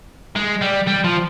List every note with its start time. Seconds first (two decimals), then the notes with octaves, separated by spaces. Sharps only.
0.36 G#3
0.61 G3
0.87 G3
1.04 F3